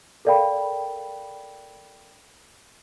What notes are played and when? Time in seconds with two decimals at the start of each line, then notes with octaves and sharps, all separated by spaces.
0.25 A4 A#4 D5 F5 G5 B5